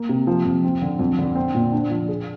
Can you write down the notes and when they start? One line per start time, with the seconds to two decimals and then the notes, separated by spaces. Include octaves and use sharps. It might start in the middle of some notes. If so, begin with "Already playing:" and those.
Already playing: A#3
0.09 C3
0.27 F3
0.45 F2
0.64 C4
0.82 D3
0.99 F2
1.19 D3
1.36 C4
1.55 A#2
1.72 D4
1.90 F3
2.08 G#4